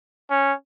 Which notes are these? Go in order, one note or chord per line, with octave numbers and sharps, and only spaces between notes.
C#4